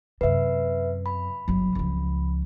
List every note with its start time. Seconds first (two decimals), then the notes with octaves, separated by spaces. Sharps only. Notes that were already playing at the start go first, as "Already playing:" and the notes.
0.21 F#2 C3 B4 E5
1.06 B5
1.48 G1 F#3
1.75 C#2 F3